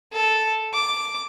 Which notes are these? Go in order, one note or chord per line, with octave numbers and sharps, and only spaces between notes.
A4
D6